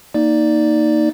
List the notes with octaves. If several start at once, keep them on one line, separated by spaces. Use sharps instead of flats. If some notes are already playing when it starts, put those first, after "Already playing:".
A#3 D#4 D5